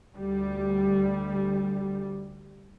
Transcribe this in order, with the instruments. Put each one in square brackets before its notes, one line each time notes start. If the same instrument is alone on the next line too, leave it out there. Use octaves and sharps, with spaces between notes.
[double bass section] D2 G3